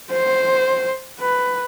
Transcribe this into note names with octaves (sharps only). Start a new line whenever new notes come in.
C5
B4